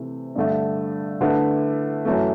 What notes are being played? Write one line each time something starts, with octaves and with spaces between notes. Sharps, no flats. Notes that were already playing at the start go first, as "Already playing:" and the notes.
Already playing: C3 E3 A3
G2 D3 A3
D3 A3 E4 B4
F#2 E3 A3